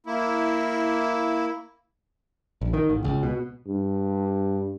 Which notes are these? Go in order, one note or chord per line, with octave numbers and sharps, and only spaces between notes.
A#3 E4
A#1
D#3
A1
C#2
B2
G2